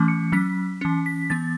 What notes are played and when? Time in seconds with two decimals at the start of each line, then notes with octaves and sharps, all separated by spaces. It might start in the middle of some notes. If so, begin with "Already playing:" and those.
Already playing: E3 A3 C#4
0.08 C#7
0.32 F#3 C#4 B6
0.81 E3 C#4 C#7
1.06 B6
1.30 E3 B3 A6